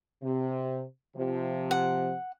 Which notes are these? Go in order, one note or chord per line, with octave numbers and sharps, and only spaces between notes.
C3
C3 F3
F#5